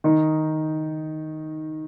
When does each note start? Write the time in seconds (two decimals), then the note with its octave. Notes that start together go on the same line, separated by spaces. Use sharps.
0.04 D#3 D#4